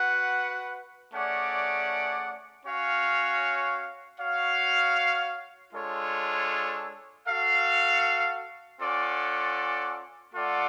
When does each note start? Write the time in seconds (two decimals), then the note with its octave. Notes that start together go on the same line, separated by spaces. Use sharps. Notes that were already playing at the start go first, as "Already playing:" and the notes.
Already playing: F#4 B4 F#5
1.12 A3 C#4 G#4 D5 F#5
2.66 C#4 F#4 C#5 F5
4.20 F#4 C#5 F5
5.74 G#3 D4 F4 A4 C#5
7.27 F#4 A4 F5
8.80 C#4 F4 A4 D5 F#5
10.34 A3 F4 A4 D5 F#5